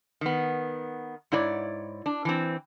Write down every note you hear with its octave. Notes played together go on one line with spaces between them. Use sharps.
D#3 B3
G#2 E4 C#5 D5
D4
E3 C4